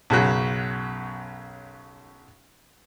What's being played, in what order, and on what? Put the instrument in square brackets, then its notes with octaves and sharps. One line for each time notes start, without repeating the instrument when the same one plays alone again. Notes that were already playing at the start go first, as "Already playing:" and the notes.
[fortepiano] B1 F#2 C#3 F#3